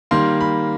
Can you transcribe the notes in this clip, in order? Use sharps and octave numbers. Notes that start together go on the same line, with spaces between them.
D#3 G3 A#3 C6
B5